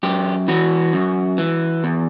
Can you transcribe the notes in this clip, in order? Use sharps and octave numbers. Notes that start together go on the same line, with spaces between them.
F#2 G4
E3 F#4
F#2
E3
E2